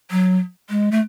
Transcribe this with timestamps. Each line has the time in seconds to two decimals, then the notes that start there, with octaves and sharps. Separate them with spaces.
0.11 F#3
0.70 G#3
0.91 A3